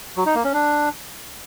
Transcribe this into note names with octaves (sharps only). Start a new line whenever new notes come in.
F#3
D#4
A#3
C#4
D4